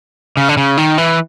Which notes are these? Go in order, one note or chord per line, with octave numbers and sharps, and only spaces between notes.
C#3
D3
C#3
D#3
E3